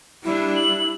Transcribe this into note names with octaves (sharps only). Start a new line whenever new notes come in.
G3 D4 E4
F#7